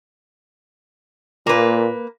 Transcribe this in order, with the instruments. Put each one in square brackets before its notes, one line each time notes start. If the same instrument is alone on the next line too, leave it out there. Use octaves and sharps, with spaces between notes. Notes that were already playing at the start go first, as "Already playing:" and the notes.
[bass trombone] A#2 [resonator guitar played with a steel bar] A#3 B4